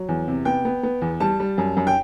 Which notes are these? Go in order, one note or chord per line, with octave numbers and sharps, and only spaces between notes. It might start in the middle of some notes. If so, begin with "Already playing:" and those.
Already playing: F#3
E2
C3
B3 G5
B3
B3
E2
G3 A5
G3
F#2
F#2
G5